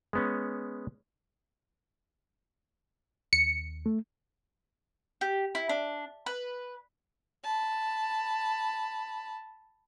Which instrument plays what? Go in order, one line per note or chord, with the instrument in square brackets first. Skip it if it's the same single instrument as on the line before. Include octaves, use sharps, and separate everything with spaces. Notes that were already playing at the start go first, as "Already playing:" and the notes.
[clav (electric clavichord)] G#3 B3 C#4
[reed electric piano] D#2 [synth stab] C#7
[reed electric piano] A3
[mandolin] G4
E4
D4
B4
[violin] A5 B5